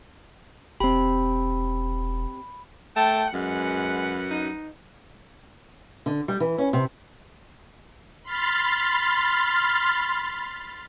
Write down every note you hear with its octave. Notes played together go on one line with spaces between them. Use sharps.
E1 C4 G4 B5
A3 G5 A5
F#2 G#3 B4 F#5
D#4
D3
G3
E3
C#4
C3
B5 C6 F6 A6